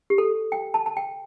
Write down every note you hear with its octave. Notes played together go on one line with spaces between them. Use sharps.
G4
A4
G5
A5
A5
G5